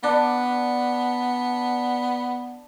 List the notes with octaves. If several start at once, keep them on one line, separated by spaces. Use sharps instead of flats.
B3 D4